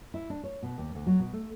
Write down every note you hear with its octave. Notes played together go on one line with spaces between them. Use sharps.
E4
D4
C#5
B2
D#2
D2
F#3
B2
A3